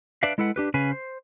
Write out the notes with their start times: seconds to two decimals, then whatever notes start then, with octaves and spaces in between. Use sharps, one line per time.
0.23 D4 B4 D5 E5 F5
0.38 G#3 E4 A4 B4 F#5
0.56 D4 G4 B4
0.74 C#3 C#4 B4 F5 G#5
0.92 C5